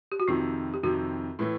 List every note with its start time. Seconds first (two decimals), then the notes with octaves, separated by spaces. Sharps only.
0.12 G4
0.20 F#4
0.28 F2 C3 D#3 F4
0.74 G4
0.83 F2 C3 D#3 F#4
1.39 A2 E3 A3